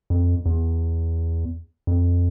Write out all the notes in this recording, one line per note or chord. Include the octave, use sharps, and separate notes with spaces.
F2
E2
F2